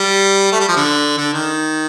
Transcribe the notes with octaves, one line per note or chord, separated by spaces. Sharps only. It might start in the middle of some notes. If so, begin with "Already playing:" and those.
Already playing: G3
A3
G3
F3
D3
D3
D#3